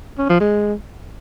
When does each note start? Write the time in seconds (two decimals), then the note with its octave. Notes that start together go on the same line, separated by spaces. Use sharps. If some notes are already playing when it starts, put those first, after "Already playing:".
0.19 C#4
0.30 F3
0.41 G#3